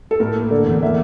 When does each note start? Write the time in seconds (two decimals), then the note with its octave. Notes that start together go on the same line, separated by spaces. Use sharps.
0.11 A4
0.20 A2 A#4
0.36 A#3
0.51 D3 A4
0.66 E2
0.82 A#3 E5